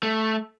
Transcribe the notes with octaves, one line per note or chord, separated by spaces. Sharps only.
A3